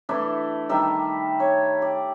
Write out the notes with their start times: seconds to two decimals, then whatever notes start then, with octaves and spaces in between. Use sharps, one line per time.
0.09 E3 A3 D4 E4
0.69 D#3 G3 E5
1.40 C#5
1.82 D5